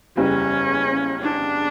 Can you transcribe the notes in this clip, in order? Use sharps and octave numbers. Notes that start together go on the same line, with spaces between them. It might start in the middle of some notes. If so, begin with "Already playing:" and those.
F#1 E2 C#3 G3 C#4
D4